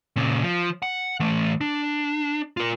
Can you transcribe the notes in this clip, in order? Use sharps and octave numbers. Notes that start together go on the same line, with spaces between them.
A#2 C#3
F3
F#5
E3 A3
D4
F4 A#4